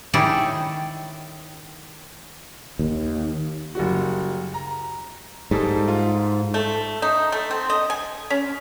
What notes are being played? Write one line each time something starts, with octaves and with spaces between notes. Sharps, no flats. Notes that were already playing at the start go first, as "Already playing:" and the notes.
D#3 E4 G4 G#4 C#5 D5
D#2
F#1 G3 F#4
A#5
G#2 G3 A4
F4
A3
D#4
A3
C4
D#5
G#5
C#4